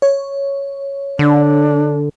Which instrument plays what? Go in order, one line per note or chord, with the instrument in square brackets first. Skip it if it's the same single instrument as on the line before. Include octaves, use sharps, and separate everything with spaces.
[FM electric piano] C#5
[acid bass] D3 [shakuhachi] D4